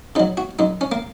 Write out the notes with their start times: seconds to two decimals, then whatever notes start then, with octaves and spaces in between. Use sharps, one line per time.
0.15 C#3 D#4
0.20 F#3
0.37 F#4
0.59 F#2 D#4
0.81 C#4
0.92 A#3